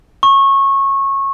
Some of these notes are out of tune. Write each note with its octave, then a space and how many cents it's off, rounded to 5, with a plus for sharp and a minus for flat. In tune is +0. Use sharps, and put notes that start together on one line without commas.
C#6 -20